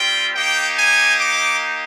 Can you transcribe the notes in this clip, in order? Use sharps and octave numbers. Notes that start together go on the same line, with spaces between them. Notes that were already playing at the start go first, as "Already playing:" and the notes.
Already playing: G3 C4 F4 G5
A#3 D#4 G4 G5
G#5
D6